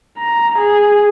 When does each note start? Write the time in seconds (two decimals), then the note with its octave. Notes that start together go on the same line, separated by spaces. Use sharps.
0.18 A#5
0.59 G#4